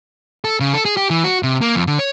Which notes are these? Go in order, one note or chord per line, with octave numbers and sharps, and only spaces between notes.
A4
C#3
A4
G#4
G4
E3
F#4
C3
A#3
F2
D3
C#5